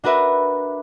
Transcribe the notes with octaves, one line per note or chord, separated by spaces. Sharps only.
D4 F#4 A#4 B4 E5